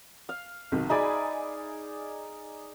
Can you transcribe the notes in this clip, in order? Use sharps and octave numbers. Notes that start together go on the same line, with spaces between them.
F5
B1 C3 D#3
D#4 G#4 D5 E5 G#5 B5